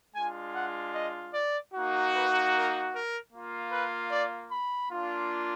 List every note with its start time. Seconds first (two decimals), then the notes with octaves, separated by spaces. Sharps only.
0.15 G#3 D4 F4 G#5
0.55 F#5
0.95 D#5
1.34 D5
1.74 A#3 D#4 F#4
2.13 B4
2.54 A#4
2.93 A#4
3.32 A#3 F4
3.72 B4
4.11 D5
4.51 B5
4.91 A#3 D4 F4